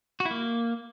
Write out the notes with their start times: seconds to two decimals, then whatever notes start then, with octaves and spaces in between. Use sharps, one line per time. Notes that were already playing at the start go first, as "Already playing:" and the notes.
0.20 F#4
0.25 E4
0.31 A#3